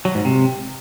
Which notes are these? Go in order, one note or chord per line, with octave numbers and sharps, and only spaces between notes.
F#3
G#2
C3